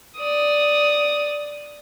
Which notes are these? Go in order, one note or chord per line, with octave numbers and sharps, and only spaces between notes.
D5 D#6